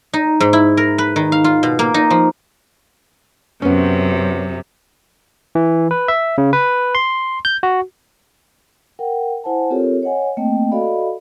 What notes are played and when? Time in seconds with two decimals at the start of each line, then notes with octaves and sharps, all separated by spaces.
0.13 D#4
0.40 G#2
0.53 E4
0.77 A#4
0.98 B4
1.16 D#3
1.32 F5
1.44 F4
1.63 B2
1.79 A#3
1.94 D#4
2.10 F3
3.62 F#2 C3 B3 C#4
5.55 E3
5.91 B4
6.08 E5
6.38 C#3
6.53 B4
6.95 C6
7.45 G6
7.63 F#4
8.99 A#4 F#5 G5
9.44 E4 C5 F#5 G#5 A5
9.70 C4 F4 G4 A4 A#4 C#5
10.02 C#5 D#5 F#5 G#5
10.37 A3 A#3 C4 D#5 G5
10.72 F#4 A4 D5 D#5 F5 B5